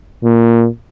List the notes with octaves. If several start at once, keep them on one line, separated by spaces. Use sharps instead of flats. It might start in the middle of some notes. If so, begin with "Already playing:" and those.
A#2